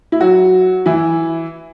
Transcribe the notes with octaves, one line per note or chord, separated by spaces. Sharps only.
E4
F#3 F#4
E3 E4